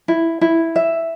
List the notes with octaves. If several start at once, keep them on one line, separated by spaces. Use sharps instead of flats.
E4
E4
E5